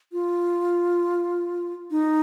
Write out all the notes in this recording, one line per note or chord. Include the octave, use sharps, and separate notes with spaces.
F4
D#4